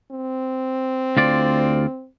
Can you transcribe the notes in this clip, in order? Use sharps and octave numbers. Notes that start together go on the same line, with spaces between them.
C4
D2 F4 D5